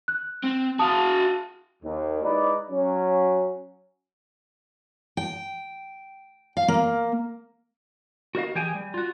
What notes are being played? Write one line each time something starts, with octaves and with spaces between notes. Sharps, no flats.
F#6
C4
F#4 F5 A5 D#6
D#2
G#3 D#4 E4 B4 D5
F#3 C#4
G5
F5
A#3
F#4 A#4 D#5 F5
E3 G4 G#4 G5 G#5
G3
F4 F#4